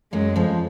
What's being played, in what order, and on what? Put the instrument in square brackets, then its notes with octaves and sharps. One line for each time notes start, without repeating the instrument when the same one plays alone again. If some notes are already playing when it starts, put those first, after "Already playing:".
[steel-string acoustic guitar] F#2 F#3 [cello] G#3
[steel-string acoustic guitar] F2 F3